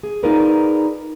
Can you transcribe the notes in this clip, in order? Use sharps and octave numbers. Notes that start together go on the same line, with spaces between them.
G#4
D#4 F4 G#4 A#4 B4 D5